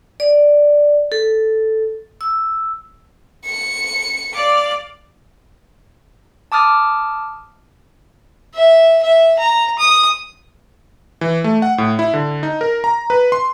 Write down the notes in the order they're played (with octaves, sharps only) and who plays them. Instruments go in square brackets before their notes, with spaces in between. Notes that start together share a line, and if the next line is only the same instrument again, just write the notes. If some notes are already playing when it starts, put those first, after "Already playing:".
[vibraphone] D5
A4
E6
[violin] C#7
[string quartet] D5 F5 D6
[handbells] A5 D6 D#6 F6 A6
[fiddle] E5
E5
A#5
D#6
[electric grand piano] E3
A3
F#5
A2
E4
D3
D#4
A#4
A#5
B4
C6